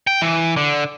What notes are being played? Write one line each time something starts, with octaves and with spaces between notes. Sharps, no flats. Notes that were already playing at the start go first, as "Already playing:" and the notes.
G5
E3
D3